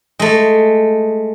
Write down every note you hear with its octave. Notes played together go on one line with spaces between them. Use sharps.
G#3 A3